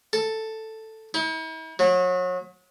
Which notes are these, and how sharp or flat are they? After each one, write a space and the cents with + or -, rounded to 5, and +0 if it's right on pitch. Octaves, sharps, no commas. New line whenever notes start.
A4 +5
E4 -45
F#3 -30